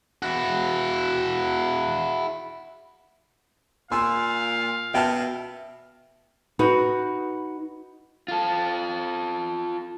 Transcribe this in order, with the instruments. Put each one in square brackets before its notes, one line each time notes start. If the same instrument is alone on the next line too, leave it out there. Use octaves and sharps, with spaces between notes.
[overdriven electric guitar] E4 F#4
[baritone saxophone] A#2 [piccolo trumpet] F5 [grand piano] G#5 C6 E6
[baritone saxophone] B2 [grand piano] E5 [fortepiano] G5 A5 F6
[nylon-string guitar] D#4 F#4 B4
[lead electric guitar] F4 A4